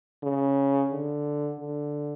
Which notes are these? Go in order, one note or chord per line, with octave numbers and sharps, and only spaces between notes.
C#3
D3
D3